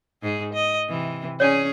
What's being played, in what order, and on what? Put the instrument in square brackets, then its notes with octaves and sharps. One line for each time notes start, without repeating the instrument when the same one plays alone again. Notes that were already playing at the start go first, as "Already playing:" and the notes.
[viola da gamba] G#2 G#4
D#5
C3 E3
[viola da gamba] C#4 G#4 [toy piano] C#5 D5